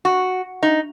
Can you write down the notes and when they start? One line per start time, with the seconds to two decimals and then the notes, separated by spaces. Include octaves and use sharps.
0.05 F#4
0.63 D#4